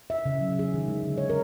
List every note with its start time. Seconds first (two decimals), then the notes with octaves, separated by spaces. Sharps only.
0.10 E5
0.26 C#3
0.41 F#3
0.59 G#4
0.74 D#3
0.88 G#3
1.03 D3
1.18 C#5
1.30 A#4